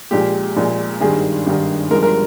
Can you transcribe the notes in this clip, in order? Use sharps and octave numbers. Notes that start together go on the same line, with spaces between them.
A#1 A#2 G#3 G4
A#1 A#2 G#3
G#1 G2 D#3 G3 G#4
G#1 G2 D#3 G3
G1 G2 F3 G#3 A#4
A#4